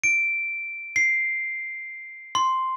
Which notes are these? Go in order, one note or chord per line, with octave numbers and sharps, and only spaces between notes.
D7
C7
C6